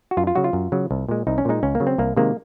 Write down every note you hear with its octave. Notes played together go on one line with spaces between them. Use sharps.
F#4
F#2 F4
F4
C#3 F#3 F#4
F4
F#2
C#3 F#3
C2
A#2 G#3
C2 D#4
C#4
A#2 G#3 D#4
C#2 C#4
A#3
C#3 F#3
C4
C2 A#3
C3 D#3 G#3 A#3